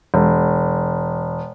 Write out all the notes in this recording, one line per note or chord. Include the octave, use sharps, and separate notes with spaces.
E1